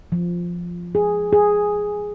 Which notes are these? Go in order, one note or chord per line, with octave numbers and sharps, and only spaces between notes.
F3
G#4
G#4